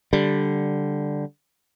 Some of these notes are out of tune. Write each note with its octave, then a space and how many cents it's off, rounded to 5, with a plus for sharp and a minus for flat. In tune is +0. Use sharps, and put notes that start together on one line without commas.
D3 +0 G3 +0